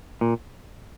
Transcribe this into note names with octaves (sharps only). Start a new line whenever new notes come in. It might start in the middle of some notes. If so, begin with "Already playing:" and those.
A#2